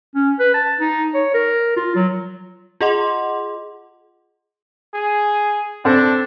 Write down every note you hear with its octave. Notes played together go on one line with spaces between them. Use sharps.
C#4
B4
A5
D#4
C#5
A#4
F4
F#3
F4 G#4 D#5 F#5 C6 D6
G#4
C4 D4 A4